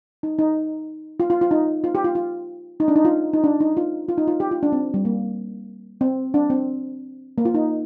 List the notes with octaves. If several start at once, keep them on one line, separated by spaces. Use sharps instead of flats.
D#4
D#4
F4
F4
F4
D#4
F4
G4
F4
F4
D#4
D4
D#4
F4
D#4
D4
D#4
F4
F4
D#4
F4
G4
F4
D4
C4
G3
A#3
C4
D4
C4
A#3
F4
D#4